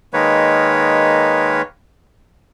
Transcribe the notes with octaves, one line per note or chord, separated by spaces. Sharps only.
D#3 G#3 A#3 B4 C#5